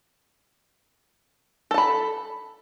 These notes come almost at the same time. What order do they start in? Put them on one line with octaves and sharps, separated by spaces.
A4 A5 B5